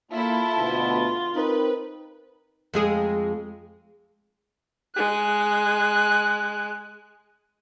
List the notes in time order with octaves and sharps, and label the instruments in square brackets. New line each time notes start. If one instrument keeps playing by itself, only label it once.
[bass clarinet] A#3 [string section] E4 A4 [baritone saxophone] F4
[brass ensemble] D2 B2 [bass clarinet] B3
[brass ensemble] C4 A#4 [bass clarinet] D#4 [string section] B4
[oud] F2 G#3 G#4
[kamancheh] G#3 F#6